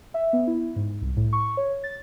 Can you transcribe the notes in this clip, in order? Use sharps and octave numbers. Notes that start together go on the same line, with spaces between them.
E5
B3
E4
G#2
C2
A2
C#6
C#5
A6